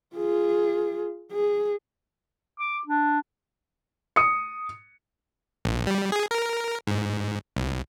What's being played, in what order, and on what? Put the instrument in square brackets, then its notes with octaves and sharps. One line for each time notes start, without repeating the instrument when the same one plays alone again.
[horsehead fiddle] F4 G#4
G#4
[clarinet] D6
D4
[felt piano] D#6 C#7
[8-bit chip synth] A#1
G3
G#4
A#4
G#2
C2